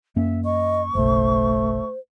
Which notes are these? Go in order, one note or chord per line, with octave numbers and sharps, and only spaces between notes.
F#2 A#3 C#4 E5
D#5 C#6
F#1 B1 A3 C5